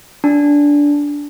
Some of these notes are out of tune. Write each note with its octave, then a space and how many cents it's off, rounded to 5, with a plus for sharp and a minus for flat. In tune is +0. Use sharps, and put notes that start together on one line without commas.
D4 -15 A5 -10